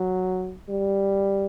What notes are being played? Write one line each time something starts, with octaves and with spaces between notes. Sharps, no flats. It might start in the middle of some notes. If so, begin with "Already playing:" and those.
Already playing: F#3
G3